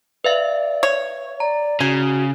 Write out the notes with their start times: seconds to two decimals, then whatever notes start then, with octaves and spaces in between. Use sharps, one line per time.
0.24 B4 D5 E5 F5
0.83 C#5
1.40 D5 A#5
1.80 C#3 F#4 G#5